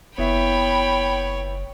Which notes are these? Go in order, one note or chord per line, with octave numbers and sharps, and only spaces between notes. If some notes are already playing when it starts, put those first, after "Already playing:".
F#1 B3 E4 C#5 E5 G5 B5